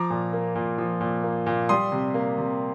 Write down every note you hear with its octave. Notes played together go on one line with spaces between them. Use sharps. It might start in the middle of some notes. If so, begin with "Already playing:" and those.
Already playing: F3 A#5 D6
A#2
A#3
A#2
F3
A#2
A#3
A#2
G3 C6 D#6
C3
A#3
C3